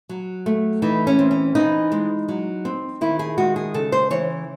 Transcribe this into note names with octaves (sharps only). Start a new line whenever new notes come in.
F#3
A3
E3 D#4
C#4
C4
C#4
E3 D#4
G#3
F#3
C4
D#3 E4
G#4
G#3 F#4
G#4
C#3 A4
C5
E3 C#5